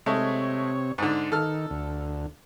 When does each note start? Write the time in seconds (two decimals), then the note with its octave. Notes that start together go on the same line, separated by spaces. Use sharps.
0.06 C3 G#3 A3 C#5
0.98 G#2 D3
1.32 D#3 A4 F6
1.70 D2